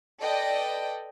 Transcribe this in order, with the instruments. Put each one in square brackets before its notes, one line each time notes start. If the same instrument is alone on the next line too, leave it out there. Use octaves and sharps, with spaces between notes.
[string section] A4 B4 D5 D#5 G5